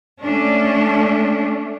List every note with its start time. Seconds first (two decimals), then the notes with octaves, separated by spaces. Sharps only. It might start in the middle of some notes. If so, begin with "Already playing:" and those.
0.22 A3 C#4 D4